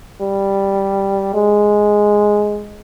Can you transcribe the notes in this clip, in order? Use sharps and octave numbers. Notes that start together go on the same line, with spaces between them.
G3
G#3